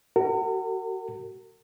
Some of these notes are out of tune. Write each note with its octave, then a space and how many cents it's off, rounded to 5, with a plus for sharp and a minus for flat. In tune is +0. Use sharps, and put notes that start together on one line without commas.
F#4 +30 A#4 -45